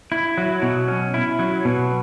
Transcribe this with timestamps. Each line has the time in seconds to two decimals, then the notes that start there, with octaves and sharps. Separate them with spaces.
0.12 E4
0.38 F#3
0.62 B2
0.88 C#4
1.14 E4
1.39 F#3
1.65 B2